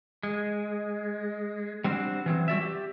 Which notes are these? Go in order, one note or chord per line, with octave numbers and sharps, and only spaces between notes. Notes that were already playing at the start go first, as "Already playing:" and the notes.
G#3
G3 C4 D4 F#4 C5
E3 F#3 C4
G3 F#4 D5 E5
G4